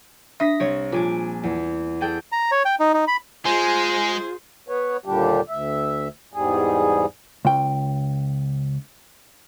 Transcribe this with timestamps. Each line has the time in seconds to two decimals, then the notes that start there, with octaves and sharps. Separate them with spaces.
0.40 D4 E5 D#6 A#6 B6
0.60 C2 C4 C#5
0.92 A#1 F4 G#5 D6
1.43 E2
2.01 G#4 A4 G5
2.32 A#5
2.52 C#5
2.65 G5
2.80 D#4
2.94 D#4
3.07 B5
3.45 G#3 F4 G#4 C5 G#5
4.68 B3 B4 C#5
5.05 D#2 A#2 D3 G3 D4 G4
5.49 D2 E5
6.34 E2 G#2 G3 G#4
7.45 C#2 G5